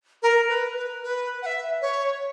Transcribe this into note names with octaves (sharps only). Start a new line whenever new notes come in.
A#4
B4
B4
B4
F#5
E5
C#5